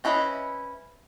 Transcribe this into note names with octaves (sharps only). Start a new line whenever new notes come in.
C4 C#4 E4 B4 D#5